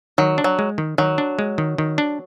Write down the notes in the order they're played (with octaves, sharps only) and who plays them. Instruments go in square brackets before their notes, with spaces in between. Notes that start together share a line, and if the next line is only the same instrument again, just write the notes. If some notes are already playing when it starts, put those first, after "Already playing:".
[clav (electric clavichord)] D#3 [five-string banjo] F#3
[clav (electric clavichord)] D4
[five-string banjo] F#3
[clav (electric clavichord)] G#3
D#3
[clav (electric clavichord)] D#3 [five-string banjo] F#3
[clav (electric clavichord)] D4
G#3
D#3
D#3
D4